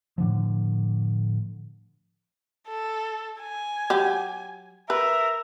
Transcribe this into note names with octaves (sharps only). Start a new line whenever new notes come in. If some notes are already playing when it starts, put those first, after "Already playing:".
A2 D3 F3
A4
G#5
F#3 G4
A#4 B4 E5